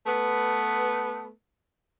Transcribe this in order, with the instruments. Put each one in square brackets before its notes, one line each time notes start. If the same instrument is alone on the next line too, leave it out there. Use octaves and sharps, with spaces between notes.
[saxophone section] A3 B3 B4